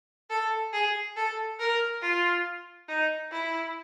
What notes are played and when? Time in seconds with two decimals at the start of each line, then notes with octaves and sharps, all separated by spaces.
0.30 A4
0.73 G#4
1.16 A4
1.60 A#4
2.02 F4
2.89 D#4
3.32 E4